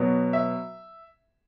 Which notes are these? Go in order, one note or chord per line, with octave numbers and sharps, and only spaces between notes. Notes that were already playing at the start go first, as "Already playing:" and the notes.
Already playing: B2 F#3 B3
E5